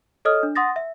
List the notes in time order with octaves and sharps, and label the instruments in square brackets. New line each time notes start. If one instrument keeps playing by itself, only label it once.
[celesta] A4 C#5 D#5 D#6 F6
D4
F#5 C6 D#6 A6 A#6
E5